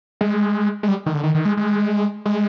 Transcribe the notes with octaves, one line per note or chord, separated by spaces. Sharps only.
G#3
G#3
G3
D#3
D3
D#3
D#3
G#3
G#3
G#3